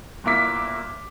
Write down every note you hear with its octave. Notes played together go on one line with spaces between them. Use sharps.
G1 A#2 A#3 E4 D6 B6